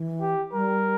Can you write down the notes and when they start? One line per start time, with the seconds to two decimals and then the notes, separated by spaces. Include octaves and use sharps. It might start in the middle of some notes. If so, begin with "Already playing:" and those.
Already playing: E3
0.21 G4
0.53 G3 A#4